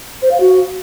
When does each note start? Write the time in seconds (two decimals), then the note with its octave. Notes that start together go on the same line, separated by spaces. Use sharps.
0.22 C5
0.31 F5
0.40 F#4